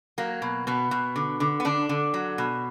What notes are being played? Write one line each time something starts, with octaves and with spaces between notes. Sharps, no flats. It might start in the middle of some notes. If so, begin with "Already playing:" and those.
F#3 A#3
B2
B2 B3
B2
D3
D3
B3
D3 D4
D3
F#3
B2